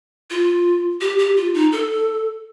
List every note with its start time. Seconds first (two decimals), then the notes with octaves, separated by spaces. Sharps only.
0.30 F4
1.01 G4
1.19 G4
1.37 F4
1.54 D#4
1.72 A4